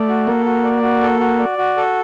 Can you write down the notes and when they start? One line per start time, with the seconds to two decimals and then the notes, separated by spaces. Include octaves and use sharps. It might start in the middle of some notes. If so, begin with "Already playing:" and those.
Already playing: A3 D5
0.09 F#4
0.27 A#3 A4
0.45 F#4
0.64 D5
0.83 F#4
1.02 A4
1.20 F#4
1.39 D5
1.58 F#4
1.77 A4